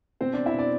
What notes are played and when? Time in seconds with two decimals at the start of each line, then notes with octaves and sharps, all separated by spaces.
0.21 B2 C4 C5
0.33 B2 D4 D5
0.46 E4 E5
0.54 B2 D4 D5